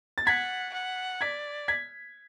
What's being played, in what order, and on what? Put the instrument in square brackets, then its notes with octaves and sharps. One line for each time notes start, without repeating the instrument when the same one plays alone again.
[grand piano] A6
[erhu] F#5 [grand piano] G#6 B6
[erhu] F#5
[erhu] D5 [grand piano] G#6 B6
[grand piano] G#6 B6